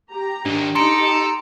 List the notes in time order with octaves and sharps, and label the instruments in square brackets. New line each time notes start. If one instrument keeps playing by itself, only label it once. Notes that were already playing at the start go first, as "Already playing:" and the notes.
[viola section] G4 A#5
[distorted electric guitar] G#2 D#3 [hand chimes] D4
[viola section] D#4 G4 [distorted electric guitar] A4 [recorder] A#5 [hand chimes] C6 C#7 D7